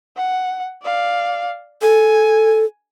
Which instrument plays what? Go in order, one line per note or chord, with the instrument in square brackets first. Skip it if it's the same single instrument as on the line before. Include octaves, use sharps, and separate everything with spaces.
[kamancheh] F#5
D5 F5
[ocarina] A4 [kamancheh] G#5